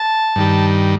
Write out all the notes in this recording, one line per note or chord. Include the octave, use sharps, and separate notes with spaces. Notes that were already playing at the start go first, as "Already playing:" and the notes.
Already playing: A5
G2 D#3 G3